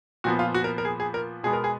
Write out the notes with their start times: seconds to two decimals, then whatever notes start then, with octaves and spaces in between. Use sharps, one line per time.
0.24 A#2 F3 B3 F#4
0.39 F4
0.54 F#4
0.64 A#4
0.78 A#4
0.85 G#4
1.00 G#4
1.14 A#4
1.43 B2 G#3 B3 G#4
1.53 A#4
1.64 G#4